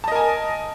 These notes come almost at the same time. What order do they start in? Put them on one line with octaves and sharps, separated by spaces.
A5 D#5 A#4 G#5